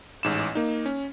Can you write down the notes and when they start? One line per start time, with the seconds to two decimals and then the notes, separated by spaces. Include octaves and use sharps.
0.23 A1 G#2 E7
0.55 A#3 D#4
0.86 C#4